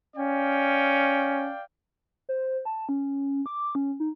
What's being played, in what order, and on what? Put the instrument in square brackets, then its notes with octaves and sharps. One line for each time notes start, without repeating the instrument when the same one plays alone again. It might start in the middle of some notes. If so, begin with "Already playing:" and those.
[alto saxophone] C#4 [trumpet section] D5 F5 G5
[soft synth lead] C5
A5
C#4
D6
C#4
D#4